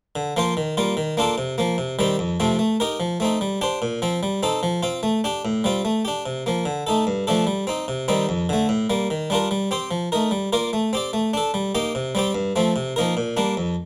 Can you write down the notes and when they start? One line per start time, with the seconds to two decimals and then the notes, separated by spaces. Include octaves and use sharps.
0.16 D3
0.37 F3 A#3 F4 C5
0.57 D#3
0.77 G3 A#3 F4
0.97 D#3
1.17 A#3 D4 F4 A4
1.38 C3
1.58 F3 A#3
1.78 C3
1.99 D#3 G3 C4 G4
2.19 F2
2.40 C3 F3 A3 C4
2.59 A3
2.80 D#4 G4 A#4
3.00 F3
3.20 A3 C4 D#4
3.41 G3
3.61 D4 G4 C5
3.82 A#2
4.02 F3 C4
4.23 G3
4.43 C4 D#4 A4
4.63 F3
4.83 C4 F4
5.03 A3
5.24 D4 G4
5.45 A2
5.64 G3 C4 F4
5.85 A3
6.05 D4 G4
6.26 C3
6.46 F3 A#3
6.66 D3
6.87 A3 D#4 A4
7.07 G2
7.27 F3 A3 D4 A4
7.47 G3
7.67 C4 D#4
7.88 C3
8.08 D#3 G3 C4 D#4
8.29 F2
8.49 D3 A3
8.69 A2
8.90 G3 A#3
9.11 D#3
9.30 G3 D4 F4 A#4
9.51 G3
9.71 C4 G4 C5
9.91 F3
10.12 A3 D#4 A#4
10.31 G3
10.53 A#3 F4 A#4 D5
10.73 A3
10.93 C4 G4 D5
11.13 A3
11.34 D4 A4
11.54 G3
11.75 A#3 D#4 G4
11.95 C3
12.15 G3 C4 G4
12.35 G2
12.56 F3 A3 C4
12.76 C3
12.96 F3 A#3 D#4 A#4
13.17 A#2
13.37 G3 A#3 D4
13.57 F2